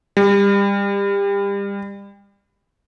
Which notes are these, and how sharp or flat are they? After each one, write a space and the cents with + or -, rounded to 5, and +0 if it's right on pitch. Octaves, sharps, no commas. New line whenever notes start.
G3 +30